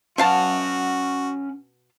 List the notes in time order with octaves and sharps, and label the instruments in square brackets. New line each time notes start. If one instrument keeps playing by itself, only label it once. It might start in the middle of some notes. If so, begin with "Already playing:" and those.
[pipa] B2 F5 A5 [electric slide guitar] C#4 F#5 [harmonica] F#4